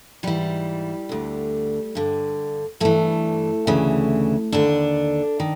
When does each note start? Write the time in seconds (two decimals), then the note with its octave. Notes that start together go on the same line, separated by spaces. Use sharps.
0.23 G#2 E3 G3
1.09 D2 D3
1.95 G2 D3
2.80 G2 E3 A3
3.67 D2 C#3 E3
4.52 D#2 D3 D4
5.40 D#3